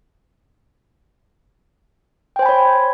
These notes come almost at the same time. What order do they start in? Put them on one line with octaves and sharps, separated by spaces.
G5 C5 G#5 B5 C#5